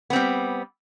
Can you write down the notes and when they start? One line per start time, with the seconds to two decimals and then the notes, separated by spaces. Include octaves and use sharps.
0.10 B3
0.13 C4
0.16 G3